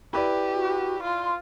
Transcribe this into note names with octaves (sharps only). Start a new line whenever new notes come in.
E4 G4 B4 D5
F#4
F4 C6